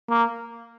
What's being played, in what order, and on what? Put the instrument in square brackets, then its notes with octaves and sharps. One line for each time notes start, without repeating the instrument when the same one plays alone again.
[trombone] A#3